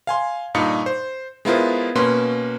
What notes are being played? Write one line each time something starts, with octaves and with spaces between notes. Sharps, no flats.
F5 G#5 C6
G2 A#2 D#4 F5 D#6 C#7
C5
G#3 B3 E4 F4 A#4 C5
B2 A#3 C#4 B4 C6